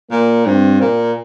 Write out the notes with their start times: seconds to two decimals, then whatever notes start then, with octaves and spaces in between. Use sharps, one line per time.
0.11 A#2 A#3
0.46 G2 C4
0.81 A#2 A#3